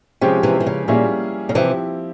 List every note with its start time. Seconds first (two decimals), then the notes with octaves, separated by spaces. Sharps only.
0.21 C3 F3 G#3 C#4 G4
0.43 C3 E3
0.60 E3
0.67 C#3
0.88 A#2 G3 A#3 C#4 E4 G#4
1.49 C#3
1.55 C3 E3 F3 C4 E4 G4